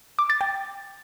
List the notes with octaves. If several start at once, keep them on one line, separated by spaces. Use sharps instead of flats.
D6
A6
G5